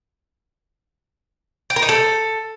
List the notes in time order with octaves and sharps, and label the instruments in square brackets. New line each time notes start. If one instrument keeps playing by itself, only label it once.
[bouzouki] G5
A#4
D#4
A4